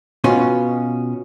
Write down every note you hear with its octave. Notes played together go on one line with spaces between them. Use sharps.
B2 C#4 F4